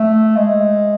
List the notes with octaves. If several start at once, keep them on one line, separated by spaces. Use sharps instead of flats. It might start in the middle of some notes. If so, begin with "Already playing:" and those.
Already playing: A3
G#3